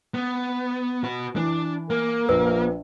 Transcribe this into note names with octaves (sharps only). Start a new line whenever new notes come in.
B3
F#4 B4
E3 D4
A#3 A#4
A#1 F3 B4